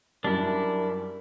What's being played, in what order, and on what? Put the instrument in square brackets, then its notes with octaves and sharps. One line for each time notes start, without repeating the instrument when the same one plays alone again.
[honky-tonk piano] F#2 G3 [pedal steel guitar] D4 E4 [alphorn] A#4